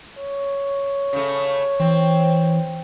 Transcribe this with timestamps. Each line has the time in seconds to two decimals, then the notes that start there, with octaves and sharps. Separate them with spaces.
0.18 C#5
1.13 C#3 A3
1.80 E3 C4